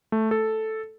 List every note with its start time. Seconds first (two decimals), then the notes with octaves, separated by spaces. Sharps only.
0.12 A3
0.31 A4